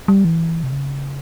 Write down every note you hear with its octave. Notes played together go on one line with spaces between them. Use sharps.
G3
E3
C3
C#3